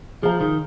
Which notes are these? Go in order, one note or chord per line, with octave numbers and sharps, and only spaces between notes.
F3 G#4 C5 F5 A#5
D#3